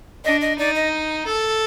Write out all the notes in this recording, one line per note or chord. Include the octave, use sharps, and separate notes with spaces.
D4 D#5
D#5
D#4 D5
D#5
A4